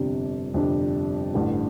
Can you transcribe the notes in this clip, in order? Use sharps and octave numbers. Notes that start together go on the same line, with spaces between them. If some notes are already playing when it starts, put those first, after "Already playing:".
Already playing: G1 F2 C3 G3 D4
G1 F2 C3 G3 D4
A1 G2 D3 G3